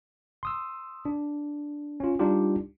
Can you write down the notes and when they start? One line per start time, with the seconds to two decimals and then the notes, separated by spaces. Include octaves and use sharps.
0.43 C6 D#6 E6
1.05 D4
2.00 C#4 F4
2.19 G3 D4 D#4 F4 G4